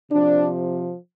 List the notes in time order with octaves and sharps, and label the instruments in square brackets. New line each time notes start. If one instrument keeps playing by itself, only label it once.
[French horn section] C3 F3 D4